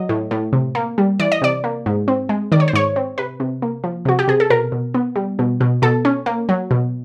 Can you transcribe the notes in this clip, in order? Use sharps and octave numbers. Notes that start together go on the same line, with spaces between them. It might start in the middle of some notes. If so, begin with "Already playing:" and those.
Already playing: F#3 D#5
A2
A2
C3
A#3
G3
E3 D5
D#5
C3 D5
A#3
G#2
C4
G#3
D#3 D5
C#5
C5
G#2 C#5
C4
C3 B4
C3
A#3
F3
C3 F#4
G4
C3 G#4
A4
B2 A#4
B2
B3
G3
B2
B2
B2 A4
C#4
A#3
F#3
B2